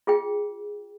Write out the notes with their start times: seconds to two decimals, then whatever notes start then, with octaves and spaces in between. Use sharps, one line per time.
0.07 F4 G#4 G5